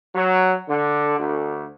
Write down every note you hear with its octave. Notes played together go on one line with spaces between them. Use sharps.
F#3
D3
D2